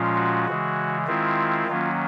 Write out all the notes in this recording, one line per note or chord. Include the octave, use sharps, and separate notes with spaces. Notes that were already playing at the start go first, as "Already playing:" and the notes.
Already playing: A#2 F3 G#3 C#4 F4
F#4
C#3 E3 G#3
D#3 G#3 C4 E4 F4
D#3 F#3 A#3 C#4